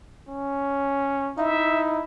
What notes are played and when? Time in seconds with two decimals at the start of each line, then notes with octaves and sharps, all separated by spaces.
0.29 C#4
1.38 D#4 E4 E5